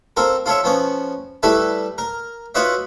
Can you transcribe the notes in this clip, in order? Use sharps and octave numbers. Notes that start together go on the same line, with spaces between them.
C4 F4 A4 A#4
F4 A4 C#5 E5
F3 B3 C#4
G3 A3 E4 A4 B4 E5
A#4
F4 F#4 B4 C#5 D#5 E5